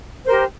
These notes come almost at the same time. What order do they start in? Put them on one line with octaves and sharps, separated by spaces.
C5 A#4 G4